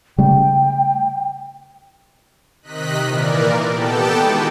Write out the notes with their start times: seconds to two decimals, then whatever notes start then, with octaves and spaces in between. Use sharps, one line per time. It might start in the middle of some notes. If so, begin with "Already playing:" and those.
0.18 C#3 G3 A3 G5
2.62 C3 D#3 D#5 F#6 B6
3.05 A#2 E3 A#4 D5
3.69 B3 G4 A4 G5 A5
4.16 D#3 G#3 E4 F#4 B4